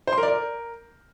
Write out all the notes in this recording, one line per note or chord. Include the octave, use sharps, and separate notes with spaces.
C5
C6
A#4
D5
A#4